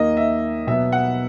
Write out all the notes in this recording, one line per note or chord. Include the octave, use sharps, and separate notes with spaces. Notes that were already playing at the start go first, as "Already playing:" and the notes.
Already playing: D#2 D#3 A#3 D#5
E5
B2 F#3 B3 E5
F#5